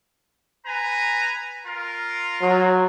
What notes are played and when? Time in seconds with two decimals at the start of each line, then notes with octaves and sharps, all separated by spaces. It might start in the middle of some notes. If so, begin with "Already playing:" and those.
0.65 B4 G#5 A#5
1.66 F4 A#4
2.42 F#3